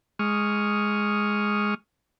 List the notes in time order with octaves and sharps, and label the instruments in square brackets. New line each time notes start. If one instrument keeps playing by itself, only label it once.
[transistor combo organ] G#3 C#6 D#6 F6